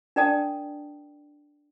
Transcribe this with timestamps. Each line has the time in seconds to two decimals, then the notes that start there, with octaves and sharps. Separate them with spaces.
0.16 D4 A#4 D5 G5 A5 D#6